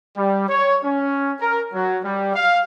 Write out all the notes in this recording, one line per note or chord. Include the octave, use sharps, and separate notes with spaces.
G3
C#5
C#4
A#4
F#3
G3
F5